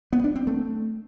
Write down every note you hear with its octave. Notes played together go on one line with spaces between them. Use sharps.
B3
D4
C4
A3